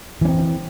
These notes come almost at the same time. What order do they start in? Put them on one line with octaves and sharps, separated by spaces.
E3 C#4 C4